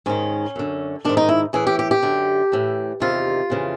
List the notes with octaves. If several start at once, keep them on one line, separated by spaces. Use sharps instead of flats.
G#2 D#3 C#4
F#2 D3
G#2 D#3 D4
D#4
E4
A2 E3 G#4
G4
G4
G4
F#2 D3
A2 E3
E2 C3 D#3 F4
F2 C#3 E3